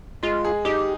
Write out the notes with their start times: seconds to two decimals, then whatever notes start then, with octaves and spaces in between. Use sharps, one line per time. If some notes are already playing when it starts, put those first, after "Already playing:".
0.23 G#3 F4
0.45 G#4
0.65 D#4 G4